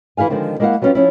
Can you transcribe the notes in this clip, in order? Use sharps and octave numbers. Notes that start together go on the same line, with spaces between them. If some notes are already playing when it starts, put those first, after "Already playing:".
E3 E4 G#4 F5 G#5
D3 D#3 F3 G#3 C4
G#3 A#3 E4 D#5 F5 F#5
F#3 G3 B3 C#4 F4 G4
F3 C#4 E4